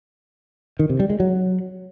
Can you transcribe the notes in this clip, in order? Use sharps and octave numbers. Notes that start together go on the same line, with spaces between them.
D#3
C3
G3
G#3
F#3